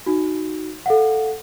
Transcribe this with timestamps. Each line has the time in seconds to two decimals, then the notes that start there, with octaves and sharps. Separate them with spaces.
0.06 D#4 F#4
0.86 A4 F5 F#5